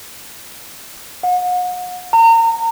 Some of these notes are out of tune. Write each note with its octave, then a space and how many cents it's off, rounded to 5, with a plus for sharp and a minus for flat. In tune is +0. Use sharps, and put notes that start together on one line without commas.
F#5 -40
A#5 -35